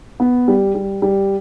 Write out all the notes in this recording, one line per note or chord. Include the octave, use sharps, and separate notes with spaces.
B3
G3
G3
G3